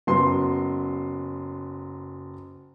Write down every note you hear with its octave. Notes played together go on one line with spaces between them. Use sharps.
F#1 F#3 B3 C6